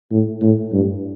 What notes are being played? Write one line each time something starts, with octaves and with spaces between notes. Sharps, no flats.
A2
A2
G2